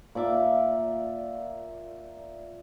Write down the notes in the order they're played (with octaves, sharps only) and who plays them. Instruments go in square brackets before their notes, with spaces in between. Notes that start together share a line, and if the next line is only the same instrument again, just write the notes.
[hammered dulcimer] A#2 D5 E5 D6